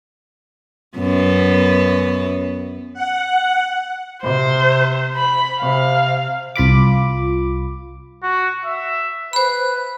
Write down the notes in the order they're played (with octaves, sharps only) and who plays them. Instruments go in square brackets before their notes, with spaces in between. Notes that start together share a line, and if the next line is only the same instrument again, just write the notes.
[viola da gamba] F#2 B3
[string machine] F#5
[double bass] C3 [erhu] C5
[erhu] B5
[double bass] C3 [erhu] F5
[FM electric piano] C2 F4 B5 D6
[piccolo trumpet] F#4
E5
[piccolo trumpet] B4 [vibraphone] C5 B5